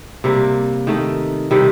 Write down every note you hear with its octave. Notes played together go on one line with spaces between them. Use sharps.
C3 G3 A#3
D#3 A3 D#4
C3 D#3 G3